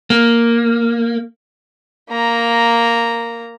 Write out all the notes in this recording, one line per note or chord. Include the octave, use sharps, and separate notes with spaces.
A#3
A#3 A#5